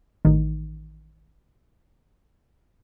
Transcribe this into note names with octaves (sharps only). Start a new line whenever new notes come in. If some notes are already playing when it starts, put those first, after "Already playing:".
A1 D#3